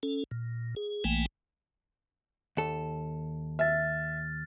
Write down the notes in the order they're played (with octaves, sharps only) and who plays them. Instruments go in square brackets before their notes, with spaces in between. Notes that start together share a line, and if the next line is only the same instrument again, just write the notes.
[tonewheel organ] C#4 A4
A#2
G#4
A#1 E3 A3 A#3 G5 G#5
[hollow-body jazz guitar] D#2 A4
[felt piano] E5 [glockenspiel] F6 A6